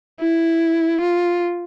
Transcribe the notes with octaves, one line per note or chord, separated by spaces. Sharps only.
E4
F4